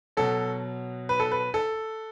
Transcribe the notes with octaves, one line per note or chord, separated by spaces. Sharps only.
B2 F#3 A4
B4
A4
B4
A4